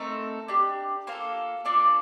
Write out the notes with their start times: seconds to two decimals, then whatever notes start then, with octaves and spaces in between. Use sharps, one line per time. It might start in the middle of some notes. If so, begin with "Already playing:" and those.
Already playing: A3 C4 D#4 A4 A#4
0.48 D4 G4
1.07 A#3 F4 A4 C5
1.65 D4 F4 A4 D5